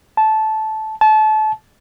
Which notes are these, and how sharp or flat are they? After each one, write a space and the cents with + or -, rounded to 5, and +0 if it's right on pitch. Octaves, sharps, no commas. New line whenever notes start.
A5 -15
A5 -30